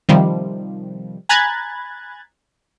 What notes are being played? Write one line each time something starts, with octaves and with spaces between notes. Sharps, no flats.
C3 D#3 F3 G3
G#5 A#5 B5 F#6 G#6 A6